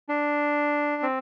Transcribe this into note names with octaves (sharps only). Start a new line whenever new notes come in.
D4
C4